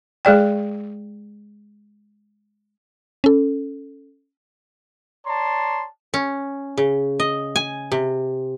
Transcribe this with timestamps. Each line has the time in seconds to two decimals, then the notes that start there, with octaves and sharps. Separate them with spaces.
0.25 G#3 G#4 D5 G5
3.24 C#4 A4
5.26 C#5 D5 A5 A#5 C6
6.14 C#4
6.78 C#3
7.20 D#5
7.56 G#5
7.92 C3